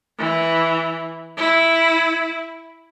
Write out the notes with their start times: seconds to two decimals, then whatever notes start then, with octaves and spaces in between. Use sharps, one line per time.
0.18 E3
1.37 E4